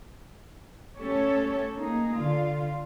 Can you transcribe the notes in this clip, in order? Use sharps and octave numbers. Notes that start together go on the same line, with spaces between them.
A3 C#4 G4 A4 C#5
A#3 D#4 G#4
D3 F4